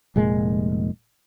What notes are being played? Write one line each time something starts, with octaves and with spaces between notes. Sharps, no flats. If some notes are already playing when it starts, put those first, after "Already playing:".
F1 A#2 G#3